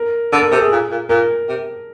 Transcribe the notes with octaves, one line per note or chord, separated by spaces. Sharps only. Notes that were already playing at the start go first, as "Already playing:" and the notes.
Already playing: A#4
D3 A4
A#4
C3 A4
G#4
A#2
A#2
A#2 A#4
C3